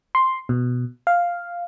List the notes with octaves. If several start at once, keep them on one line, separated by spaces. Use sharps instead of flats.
C6
B2
F5